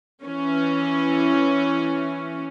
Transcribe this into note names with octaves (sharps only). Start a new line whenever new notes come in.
E3 C#4